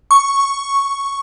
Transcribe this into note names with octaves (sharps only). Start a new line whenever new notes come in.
C#6